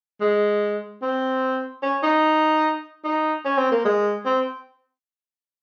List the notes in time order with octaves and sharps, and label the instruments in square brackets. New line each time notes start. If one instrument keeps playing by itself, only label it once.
[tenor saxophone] G#3
C4
C#4
D#4
D#4
C#4
C4
A#3
G#3
C4